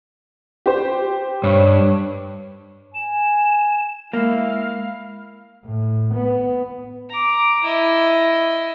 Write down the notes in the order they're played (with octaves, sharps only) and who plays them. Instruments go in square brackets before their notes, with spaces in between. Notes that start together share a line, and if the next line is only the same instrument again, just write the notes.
[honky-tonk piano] G4 C5
[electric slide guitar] G2 [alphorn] C#5
[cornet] G#5 [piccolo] E7
[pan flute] G#3 [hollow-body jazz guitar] A#3 [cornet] E4 [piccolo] F5
[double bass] A2
B3
[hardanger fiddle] A#5 D6
E4 D#5